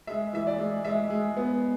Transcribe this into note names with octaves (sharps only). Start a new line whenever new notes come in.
G#3 E5
E3 E5
D5
G#3
G#3 E5
G#3
B3